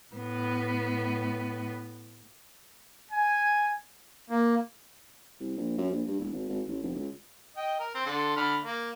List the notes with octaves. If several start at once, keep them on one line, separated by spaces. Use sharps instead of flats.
A2 B3
G#5
A#3
C2
A#1
F#2
A#1
G2
E1
G#1
G#1
A1
F1
C#2
D#5 G5
A#4
C4
D3 A4 C6
D3 B5 F6
A#3